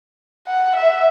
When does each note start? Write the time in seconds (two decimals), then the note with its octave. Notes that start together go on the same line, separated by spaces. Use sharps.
0.47 F#5
0.75 E5